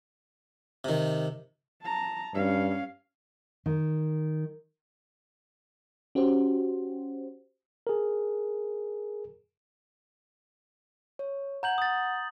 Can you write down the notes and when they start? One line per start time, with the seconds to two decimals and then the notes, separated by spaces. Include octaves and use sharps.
0.84 C3 D#3
1.83 A5 A#5
2.35 G2 C#4 F5
3.66 D#3
6.15 C#4 F#4 G4 C5
7.87 G#4 A#4
11.19 C#5
11.63 F#5 A#5 G6 G#6 F#7
11.78 D#6 A6